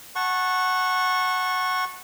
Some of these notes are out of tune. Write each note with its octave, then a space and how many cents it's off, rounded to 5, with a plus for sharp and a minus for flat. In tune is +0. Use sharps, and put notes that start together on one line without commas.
F#5 +0 A5 -5 C#6 -20